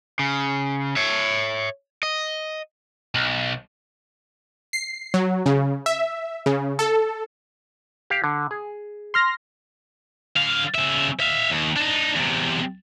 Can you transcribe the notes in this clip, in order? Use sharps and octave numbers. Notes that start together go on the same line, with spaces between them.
C#3
C#5 E5
D#5
B1
C7
F#3
C#3
E5
C#3
A4
G4 F5
D3
G#4
C6 F6 A#6
D3 F5
C#3 E5
E5 F5
D#2
D4 D#4
E2 C3